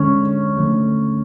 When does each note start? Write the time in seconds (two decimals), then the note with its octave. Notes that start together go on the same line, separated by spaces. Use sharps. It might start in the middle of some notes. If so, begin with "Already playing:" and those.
Already playing: D3 G#3 C#4 D4
0.57 D3 F3 A3